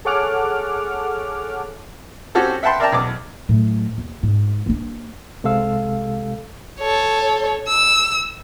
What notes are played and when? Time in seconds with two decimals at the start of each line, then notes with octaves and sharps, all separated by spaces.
0.05 G#4 A4 C#5 F#5 D6 F6
2.35 C4 C#4 F#4 G4 A4
2.63 E5 F#5 G5 A5 B5 C6
2.80 A#4 D5 E5 G5 A5 A#5
2.92 B1 E2 D6
3.49 A2 F#3
3.98 D#2
4.23 G#2
4.66 A#3 D4
5.44 C2 C3 G#3 A4 F5 E6
6.79 A4 C#5
7.68 E6